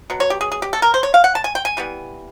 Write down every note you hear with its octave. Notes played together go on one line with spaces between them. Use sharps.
B2 F#3
C#5
G4
G#4
G#4
G4
A4
A#4
C5
C#5
F5
F#5
A5
G#5
G5
G#5
E3 G3 B3